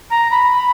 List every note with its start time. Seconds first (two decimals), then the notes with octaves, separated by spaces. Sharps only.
0.10 A#5
0.30 B5